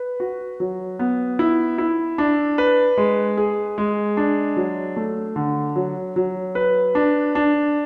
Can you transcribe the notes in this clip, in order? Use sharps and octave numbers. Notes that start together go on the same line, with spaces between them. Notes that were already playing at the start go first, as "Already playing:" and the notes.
Already playing: B4
F#4
F#3
B3
E4
E4
D4
B4
G#3
G#4
G#3
D4
F#3
A3
D3
F#3
F#3
B4
D4
D4